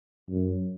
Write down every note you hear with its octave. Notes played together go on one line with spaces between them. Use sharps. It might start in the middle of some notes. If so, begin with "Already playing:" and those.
F#2